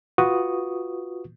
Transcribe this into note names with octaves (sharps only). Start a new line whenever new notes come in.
F4 F#4 B4 C#6 D#6